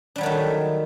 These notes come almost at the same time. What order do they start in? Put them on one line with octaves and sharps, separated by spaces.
D4 G3 F#3 D#3 A3